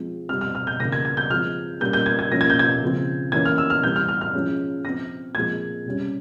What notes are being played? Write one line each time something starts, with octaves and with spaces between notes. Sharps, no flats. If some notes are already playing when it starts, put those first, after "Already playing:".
Already playing: F3 G#3 C4
C3 G3 C4 F6
F6
F6
G6
C#3 E3 A#3 A#6
G#6
G#6
G6
F3 G#3 C4 F6
A#2 G3 A#3 C#4 G6
G6
G#6
G#6
F3 A#3 C#4 A#6
G#6
G6
G#6
C#3 F3 C4
E3 A#3 C#4 G#6
F6
E6
F6
E3 G3 C4 G6
F6
F6
F6
F3 G#3 C#4
F3 C4 A#6
A#2 F3 G#3 C4 G#6
C3 G3 C#4